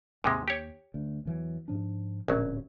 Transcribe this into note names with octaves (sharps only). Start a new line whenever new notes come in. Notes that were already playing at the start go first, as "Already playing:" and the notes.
D#2 G#2 C3 G#3
G4 C#5
D2
E2 E3 F#3
G#2 F3 D4
D1 A#1 F#3 C#4